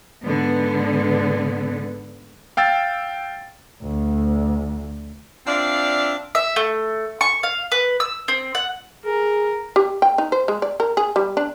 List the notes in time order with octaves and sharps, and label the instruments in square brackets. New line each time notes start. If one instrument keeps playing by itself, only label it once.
[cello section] G#2 D3 B3
[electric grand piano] F5 G5 E6 A6
[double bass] D2
[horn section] C4 D4 F4 D5 E5 F5
[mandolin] E5
A3
C#6
F5
B4
E6
C4
F#5
[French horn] G#4 [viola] A#4
[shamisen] G4
G5
D#4
C5
G#3
D5
A#4
G#4
G3
D4